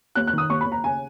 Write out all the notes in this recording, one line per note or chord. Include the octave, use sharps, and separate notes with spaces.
D#2 F#6
F#6
D#3 D#6
D#2 C#6
B5
D#2
A#5
C#3 G#5